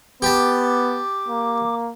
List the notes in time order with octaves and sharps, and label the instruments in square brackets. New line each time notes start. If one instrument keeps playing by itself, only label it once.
[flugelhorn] B3 [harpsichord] G4 A5 [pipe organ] D6
[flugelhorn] A#3